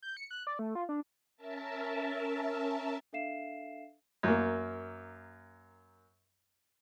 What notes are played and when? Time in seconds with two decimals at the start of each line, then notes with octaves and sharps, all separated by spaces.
0.03 G6
0.17 C#7
0.31 F#6
0.47 D5
0.59 A3
0.75 F4
0.89 D4
1.36 C#4 A#4 E5 A5
3.13 D4 A4 E5 F5 C7 E7
4.23 F#2 A#3